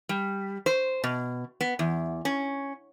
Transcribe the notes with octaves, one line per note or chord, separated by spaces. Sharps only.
G3
C5
B2
B3
E2
C#4